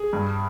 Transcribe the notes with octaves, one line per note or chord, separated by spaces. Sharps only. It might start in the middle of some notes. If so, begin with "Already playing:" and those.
Already playing: G#4
G2